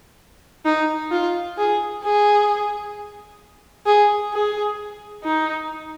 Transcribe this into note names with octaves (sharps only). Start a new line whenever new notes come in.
D#4
F4
G#4
G#4
G#4
G#4
D#4